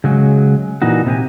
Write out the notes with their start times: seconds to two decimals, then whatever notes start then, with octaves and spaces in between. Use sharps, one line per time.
0.04 C#3 F#3 G#3
0.82 A#2 E3 D#4 F#4
1.06 C3 G4 G#5